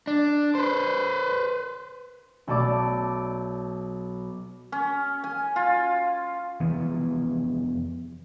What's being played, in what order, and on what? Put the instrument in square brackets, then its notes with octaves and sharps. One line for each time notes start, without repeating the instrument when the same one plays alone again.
[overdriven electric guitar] D4
B4 C5
[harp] B1 A3 A4 D5 D6
[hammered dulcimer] C#4
G#5
F4
[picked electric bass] F1 E3 B3